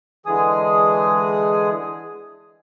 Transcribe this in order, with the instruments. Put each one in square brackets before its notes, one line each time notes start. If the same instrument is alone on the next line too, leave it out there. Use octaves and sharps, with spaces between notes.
[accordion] D3 E3 G#3 G#4 G#5 D#6